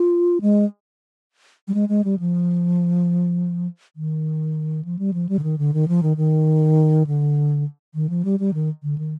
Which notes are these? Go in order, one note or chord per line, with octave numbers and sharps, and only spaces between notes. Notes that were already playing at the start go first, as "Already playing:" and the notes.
Already playing: F4
G#3
G3
G#3
G#3
G3
F3
D#3
F3
G3
F3
G3
D3
D#3
D3
D#3
F3
D#3
D#3
D3
D#3
F3
G3
G3
D#3
D3
D#3